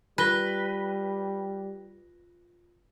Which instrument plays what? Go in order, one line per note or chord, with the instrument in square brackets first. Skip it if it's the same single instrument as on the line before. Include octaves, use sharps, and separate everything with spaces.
[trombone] G3 [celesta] F4 A#6 G7 [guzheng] B4